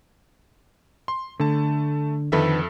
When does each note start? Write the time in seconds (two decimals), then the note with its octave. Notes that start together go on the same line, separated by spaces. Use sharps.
1.08 C6
1.40 D3 A3 A5
2.32 F2 D3 D#3 A4 B4 E5